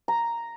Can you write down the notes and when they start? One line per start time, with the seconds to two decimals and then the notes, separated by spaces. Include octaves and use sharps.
0.08 A#5